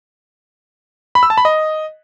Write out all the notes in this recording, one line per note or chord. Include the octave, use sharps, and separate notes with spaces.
B5
E6
A5
B5
D#5